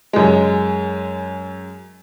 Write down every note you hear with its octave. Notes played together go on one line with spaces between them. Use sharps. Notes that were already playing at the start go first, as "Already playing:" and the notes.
F#2 G#3